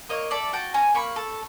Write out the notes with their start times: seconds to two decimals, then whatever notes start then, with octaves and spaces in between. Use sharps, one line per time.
0.09 A#3 C#5 D#5
0.31 A4 D5 E5
0.53 F#4 G5 A5
0.74 C#4 G#5 A#5
0.94 A#3 B5 C#6
1.16 A4